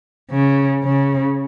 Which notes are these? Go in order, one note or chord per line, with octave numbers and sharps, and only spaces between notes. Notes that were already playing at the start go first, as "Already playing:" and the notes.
C#3
C#3